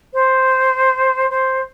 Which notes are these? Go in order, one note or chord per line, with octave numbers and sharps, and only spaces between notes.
C5
C5